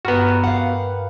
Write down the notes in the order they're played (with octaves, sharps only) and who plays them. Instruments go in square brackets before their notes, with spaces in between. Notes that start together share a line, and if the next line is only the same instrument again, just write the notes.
[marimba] G2 F6 [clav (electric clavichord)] B3 F#4 [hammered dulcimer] G4 A#4 B4
[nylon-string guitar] F5 F#5